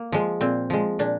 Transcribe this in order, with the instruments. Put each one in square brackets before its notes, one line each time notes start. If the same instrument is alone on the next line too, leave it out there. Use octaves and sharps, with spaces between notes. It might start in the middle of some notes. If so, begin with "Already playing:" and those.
Already playing: [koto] A#3
F3 G#3
A#2 C4
F3 G#3
A#2 D4